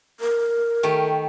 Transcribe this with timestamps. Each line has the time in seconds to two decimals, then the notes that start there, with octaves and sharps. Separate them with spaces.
0.20 A#4
0.83 D#3 A3 G4